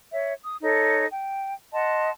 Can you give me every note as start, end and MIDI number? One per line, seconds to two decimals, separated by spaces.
0.12 0.33 73
0.12 0.33 76
0.44 0.57 87
0.62 1.05 63
0.62 1.05 69
0.62 1.05 73
1.11 1.53 79
1.74 2.11 75
1.74 2.11 78
1.74 2.11 81
1.74 2.11 84